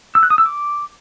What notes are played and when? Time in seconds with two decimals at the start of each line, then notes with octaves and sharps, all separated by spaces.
0.15 E6
0.23 F#6
0.30 D#6
0.38 E6
0.46 D6